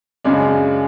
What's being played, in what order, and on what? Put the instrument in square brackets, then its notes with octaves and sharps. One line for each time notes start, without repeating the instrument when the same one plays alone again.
[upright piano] F#2 C#3 G#3 D4